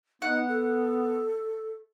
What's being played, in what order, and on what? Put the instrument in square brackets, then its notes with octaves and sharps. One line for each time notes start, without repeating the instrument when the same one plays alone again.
[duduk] B3 [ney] D#4 [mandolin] F#5
[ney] A4